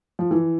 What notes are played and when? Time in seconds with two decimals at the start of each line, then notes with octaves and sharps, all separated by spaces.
0.19 F3
0.31 E3